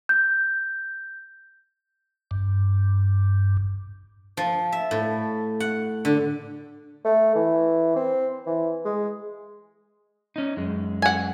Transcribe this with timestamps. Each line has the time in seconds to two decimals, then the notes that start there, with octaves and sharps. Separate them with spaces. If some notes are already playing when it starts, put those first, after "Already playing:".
0.09 G6
2.31 G2
4.37 F3
4.72 E5
4.91 A2
5.60 F#5
6.05 D3
7.05 A3
7.35 E3
7.96 C4
8.46 E3
8.85 G#3
10.36 C#4 D#4
10.57 F#2 G#3
11.02 F#5 G#5